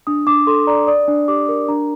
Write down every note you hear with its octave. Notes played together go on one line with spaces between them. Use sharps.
D4 D#6
D4 D6
A4 C6
D5 A#5
D5 D#6
D4
G4 D6
A#4
D4 A#5